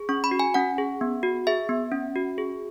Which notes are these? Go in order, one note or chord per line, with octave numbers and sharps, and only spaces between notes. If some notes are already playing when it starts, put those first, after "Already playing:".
Already playing: G#4
C#4 C#6
B5
F#4
G#5
C#4 F#5
G#4
B3
F#4
G#4 E5
B3
C#4
F#4
G#4